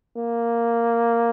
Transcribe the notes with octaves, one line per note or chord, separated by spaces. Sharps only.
A#3